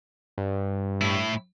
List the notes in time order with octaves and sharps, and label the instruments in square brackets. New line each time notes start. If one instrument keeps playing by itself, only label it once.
[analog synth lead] G2
[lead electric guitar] A2 E4